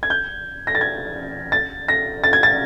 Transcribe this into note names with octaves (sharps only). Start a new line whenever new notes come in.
G#6
G6
A#6
A6
G#6
A6
A#6
A6
G#6
A6